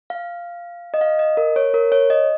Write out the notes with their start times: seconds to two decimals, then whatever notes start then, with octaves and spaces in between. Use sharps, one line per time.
0.10 F5
0.94 D#5
1.01 F5
1.19 D#5
1.37 A#4
1.56 C#5
1.74 A#4
1.92 C#5
2.10 D#5